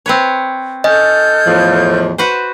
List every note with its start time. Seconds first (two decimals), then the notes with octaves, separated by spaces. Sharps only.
0.06 C4 B4 C#5
0.84 C#4 A4 D#5 F6 G6
1.46 E2 A2 F3
2.18 F#4 B4 C5